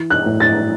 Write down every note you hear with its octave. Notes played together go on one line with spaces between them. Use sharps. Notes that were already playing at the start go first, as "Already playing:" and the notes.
Already playing: E3
F#6
A2
A6